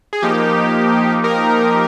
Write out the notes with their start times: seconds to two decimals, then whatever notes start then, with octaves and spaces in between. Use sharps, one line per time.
0.13 G#4
0.22 F3 A#3 D#4 G4
1.24 G4 A#4